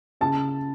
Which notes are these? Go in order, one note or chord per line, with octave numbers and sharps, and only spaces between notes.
C#3 A5